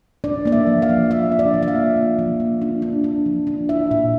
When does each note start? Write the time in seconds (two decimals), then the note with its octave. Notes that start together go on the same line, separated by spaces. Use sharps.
0.24 D4 D5
0.45 A#3 D5
0.52 E5
0.67 F3
0.82 F5
0.89 F3
1.11 F3 E5
1.32 D4
1.39 D5
1.54 F3
1.63 E5
1.68 F5
1.75 A#3
1.96 A#3
2.19 F3
2.40 A#3
2.62 D4
2.82 D4
3.04 D4
3.26 F3
3.47 D4
3.69 E4 E5
3.91 A#2 E5